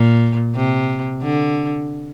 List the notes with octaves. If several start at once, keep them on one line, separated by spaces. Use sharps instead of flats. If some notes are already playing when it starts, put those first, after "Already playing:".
Already playing: A#2
C3
D3